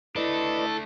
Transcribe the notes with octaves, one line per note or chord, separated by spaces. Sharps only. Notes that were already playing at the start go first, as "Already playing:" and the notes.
A3 D4 E4 A4 B4 D5 D#5